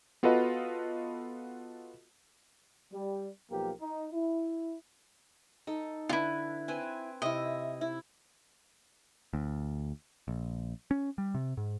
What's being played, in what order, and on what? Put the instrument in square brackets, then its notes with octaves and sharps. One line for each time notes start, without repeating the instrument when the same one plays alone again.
[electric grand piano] B3 F4 F#4 A4 B4 D#5
[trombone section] G3
B1 F3 A#3 G4 A#4
D#4
E4
[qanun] D#4 A4
[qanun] D3 B4 [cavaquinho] E4 F4
[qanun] C4 B4 G#5
[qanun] C3 E4 [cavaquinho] D#5
[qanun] E4
[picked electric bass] D2
A#1
C#4
G3
C3
G#2